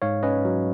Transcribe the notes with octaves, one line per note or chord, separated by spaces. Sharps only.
G#2 C#5 F5
C#4 B4 D#5
F#3